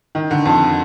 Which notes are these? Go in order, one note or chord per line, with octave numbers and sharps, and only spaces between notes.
D#3
D3
F2